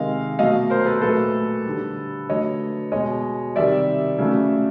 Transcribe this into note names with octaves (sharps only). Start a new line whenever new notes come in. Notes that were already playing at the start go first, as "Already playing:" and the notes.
Already playing: C3 D#3 G#3 D#5 F5
B2 F#3 A3 D#5 F5
A#4 C5
A4 B4
A#2 F#3 A3 A4 B4
D3 G3
D3 F#3 A3 C#5 D#5
B2 G#3 C#5 D#5
C3 D#3 G3 D5 E5
C#3 F#3 A3